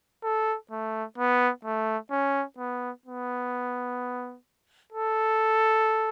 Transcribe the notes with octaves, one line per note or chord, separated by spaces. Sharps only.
A4
A3
B3
A3
C#4
B3
B3
A4